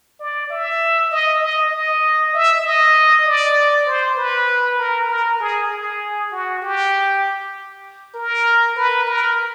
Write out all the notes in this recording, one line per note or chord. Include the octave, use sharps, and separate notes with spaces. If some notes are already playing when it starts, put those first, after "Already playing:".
D5
E5
D#5
D#5
D#5
E5
D#5
D5
C5
B4
A#4
A#4
G#4
G#4
F#4
G4
A#4
B4
A#4